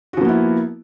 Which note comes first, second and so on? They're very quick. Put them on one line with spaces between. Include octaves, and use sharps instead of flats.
F#4 F3 A#3 B3 E4